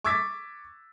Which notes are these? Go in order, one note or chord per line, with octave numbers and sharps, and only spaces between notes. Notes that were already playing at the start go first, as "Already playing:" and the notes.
C#6 D6 E6 G#6 A6 B6